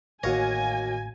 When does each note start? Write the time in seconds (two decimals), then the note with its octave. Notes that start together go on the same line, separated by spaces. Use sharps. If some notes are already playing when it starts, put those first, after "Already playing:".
0.23 A1 D#2 F#4 C#5 F5 G#5 A#6